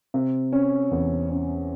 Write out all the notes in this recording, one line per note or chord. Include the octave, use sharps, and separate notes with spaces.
C3
C#4
E2
C#4